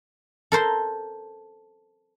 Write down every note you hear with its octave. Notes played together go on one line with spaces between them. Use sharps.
A4 A#4 C5 C6